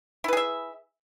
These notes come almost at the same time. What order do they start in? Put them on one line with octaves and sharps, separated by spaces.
E4 B4 G#4 E5